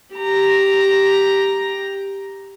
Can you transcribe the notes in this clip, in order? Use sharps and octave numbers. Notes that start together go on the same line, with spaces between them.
G4 A#5